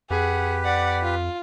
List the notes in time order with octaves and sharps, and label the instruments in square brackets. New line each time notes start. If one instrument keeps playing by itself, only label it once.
[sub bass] F2 [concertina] G4 B4 [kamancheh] G#4 F#5
[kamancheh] D5 F#5
F4